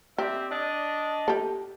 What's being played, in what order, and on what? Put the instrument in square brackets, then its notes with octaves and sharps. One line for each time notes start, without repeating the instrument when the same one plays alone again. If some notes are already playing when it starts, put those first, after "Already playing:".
[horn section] C4 D5 E5 [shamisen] G4
[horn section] D4 D#5
[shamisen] G4 A4